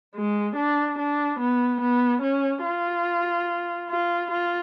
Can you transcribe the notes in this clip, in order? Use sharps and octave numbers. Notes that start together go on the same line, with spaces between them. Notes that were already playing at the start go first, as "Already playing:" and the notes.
G#3
D4
D4
B3
B3
C#4
F4
F4
F4